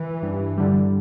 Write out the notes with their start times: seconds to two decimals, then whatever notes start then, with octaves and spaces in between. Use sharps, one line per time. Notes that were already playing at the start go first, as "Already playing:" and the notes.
Already playing: E3
0.23 G2
0.57 D3 G3